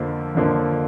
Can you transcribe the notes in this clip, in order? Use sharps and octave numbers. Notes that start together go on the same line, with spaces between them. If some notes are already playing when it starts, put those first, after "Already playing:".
Already playing: F2 D3 F3 A#3
F2 D3 F3 A#3